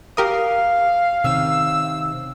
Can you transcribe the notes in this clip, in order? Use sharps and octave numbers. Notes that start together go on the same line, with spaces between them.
G4 A#4 F5 D#6
C3 D#3 C#4 E6